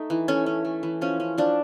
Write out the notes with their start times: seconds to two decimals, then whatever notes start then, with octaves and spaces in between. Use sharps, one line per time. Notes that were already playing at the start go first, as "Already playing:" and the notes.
Already playing: A3 D#4
0.10 E3
0.28 A3 C#4
0.46 C#4
0.65 A3
0.83 E3
1.01 F3 C#4
1.20 C#4
1.38 F3 D4